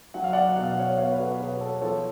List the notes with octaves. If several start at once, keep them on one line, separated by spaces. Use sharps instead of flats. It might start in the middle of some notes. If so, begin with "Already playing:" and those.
F#3 F#5
F5
D5 F#5
B2 F#5
F5
D5
C#5 F5
B3 C#5 F5
B4
F#4 A4
B2 G#4 B4
A4 C#5
F3 A4 C#5